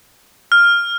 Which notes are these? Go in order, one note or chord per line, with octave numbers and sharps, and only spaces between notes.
F6